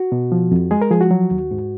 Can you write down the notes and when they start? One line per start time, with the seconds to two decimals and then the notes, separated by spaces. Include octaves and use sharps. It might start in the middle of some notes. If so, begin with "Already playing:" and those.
Already playing: F#4
0.12 B2
0.32 F3
0.52 F2
0.71 G#3 G#4
0.82 A#4
0.91 F3 G#4
1.01 F#4
1.11 F#3
1.31 D#2
1.51 G#2